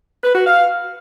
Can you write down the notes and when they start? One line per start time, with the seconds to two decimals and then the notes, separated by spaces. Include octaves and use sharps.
0.24 B4
0.35 F#4
0.46 F5